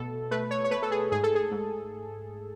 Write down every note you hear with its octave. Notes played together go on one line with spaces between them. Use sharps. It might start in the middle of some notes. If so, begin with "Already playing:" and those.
Already playing: B2 A3 A4
A3 B4
C#5
C#5
A3 B4
A4
G#4
G#2 G#4
A4
G#4
G#2